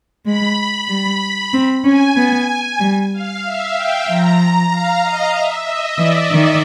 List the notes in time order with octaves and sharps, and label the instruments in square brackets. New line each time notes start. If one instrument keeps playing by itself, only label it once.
[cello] G#3 [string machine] B5
[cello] G3
C4
[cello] C#4 [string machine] G#5
[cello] B3
G3
[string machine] F5
E5
G5
[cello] F3 [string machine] A#5
[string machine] A#5
F5
D#5
E5
D#5
[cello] E3 [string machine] D5
[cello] D#3 [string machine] D#5